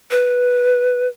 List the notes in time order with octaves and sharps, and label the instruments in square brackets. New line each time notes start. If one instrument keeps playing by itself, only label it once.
[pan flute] B4